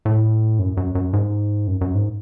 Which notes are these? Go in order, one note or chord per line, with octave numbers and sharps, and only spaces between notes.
A2
F#2
F#2
F#2
G#2
F#2
F#2
G#2